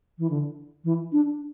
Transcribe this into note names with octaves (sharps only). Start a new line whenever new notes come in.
E3
D3
E3
D4